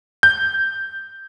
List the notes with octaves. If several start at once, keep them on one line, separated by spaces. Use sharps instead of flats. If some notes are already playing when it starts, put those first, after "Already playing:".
G6